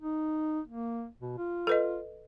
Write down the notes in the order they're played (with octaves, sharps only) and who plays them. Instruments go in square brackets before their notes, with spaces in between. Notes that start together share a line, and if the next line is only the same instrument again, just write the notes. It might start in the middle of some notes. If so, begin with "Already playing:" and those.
[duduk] D#4
A#3
B2
F4
[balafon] A4 B4 D#5